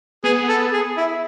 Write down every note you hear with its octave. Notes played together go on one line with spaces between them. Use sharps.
B3 G#4
A4
G#4
E4